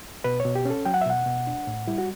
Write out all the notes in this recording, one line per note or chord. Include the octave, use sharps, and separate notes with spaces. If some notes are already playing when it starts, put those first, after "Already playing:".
B2 B4
C#5
B2
G4
C#4 A4
F#3 G5
F#5
E5
B2 F#5
B2
D4
A2
G3 E4
F#4